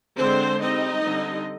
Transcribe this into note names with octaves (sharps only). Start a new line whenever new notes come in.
D3 G#3 C4 D4 C5
G3 C4 D#4 D#5
D3 G3 C4